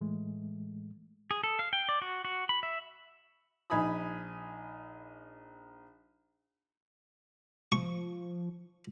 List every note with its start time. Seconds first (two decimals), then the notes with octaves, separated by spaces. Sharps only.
0.01 A2 E3 G#3 A3
1.31 G#4
1.44 A4
1.59 F5
1.73 G5
1.89 D5
2.02 F#4
2.25 F#4
2.49 B5
2.63 E5
3.70 A#1 D#4 G#5 B5 D#6
7.72 F3 C#6